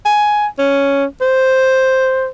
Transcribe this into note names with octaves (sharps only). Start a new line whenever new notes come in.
G#5
C#4
C5